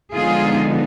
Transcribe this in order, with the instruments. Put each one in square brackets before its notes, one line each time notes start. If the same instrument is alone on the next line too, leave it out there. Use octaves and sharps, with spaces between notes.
[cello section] D3 F3 G#3 B3 D#4 F4 G#4